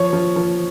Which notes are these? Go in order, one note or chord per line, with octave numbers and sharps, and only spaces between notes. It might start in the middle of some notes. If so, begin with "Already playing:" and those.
Already playing: F3 C#5
F3
F3